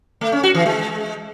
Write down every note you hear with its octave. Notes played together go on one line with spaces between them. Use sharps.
A3
C#4
F#4
E3
G#3